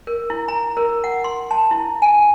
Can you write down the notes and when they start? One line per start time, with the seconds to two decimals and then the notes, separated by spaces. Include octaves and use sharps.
0.07 A#4
0.30 E4
0.48 A#5
0.77 A#4
1.04 F#5
1.24 C6
1.51 A5
1.71 E4
2.02 G#5